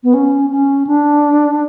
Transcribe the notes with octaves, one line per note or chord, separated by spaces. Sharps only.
B3
C#4
C#4
D4